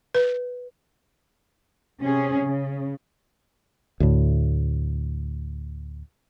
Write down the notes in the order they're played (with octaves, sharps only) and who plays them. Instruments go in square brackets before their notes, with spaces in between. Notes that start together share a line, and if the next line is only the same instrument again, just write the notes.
[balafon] B4
[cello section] C3 C#4 G#4
C#3
[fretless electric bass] D2 A2